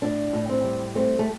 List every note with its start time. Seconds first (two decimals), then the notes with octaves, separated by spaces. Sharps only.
0.02 A2 D4
0.33 A2
0.49 C4
0.64 G3
0.95 A3 C4
1.19 A3